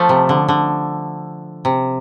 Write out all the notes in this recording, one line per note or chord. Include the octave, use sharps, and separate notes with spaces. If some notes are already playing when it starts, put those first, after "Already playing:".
Already playing: F3 A3
C3
D3
D3
C3